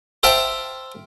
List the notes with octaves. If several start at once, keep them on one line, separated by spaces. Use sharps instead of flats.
C5 E5 F5 G5 A5